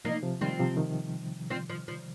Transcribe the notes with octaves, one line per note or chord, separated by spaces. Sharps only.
C3 F3 A#3 D#4
C3 F3
D#3 G3 C4 F4
C3 F3
D#3
C4 F4
F3
F3